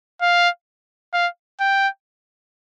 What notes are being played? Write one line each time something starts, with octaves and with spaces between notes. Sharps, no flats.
F5
F5
G5